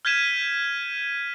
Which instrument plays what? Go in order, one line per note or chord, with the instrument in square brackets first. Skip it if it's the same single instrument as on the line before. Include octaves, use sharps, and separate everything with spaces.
[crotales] F6 G6 G#6 B6 D#7 E7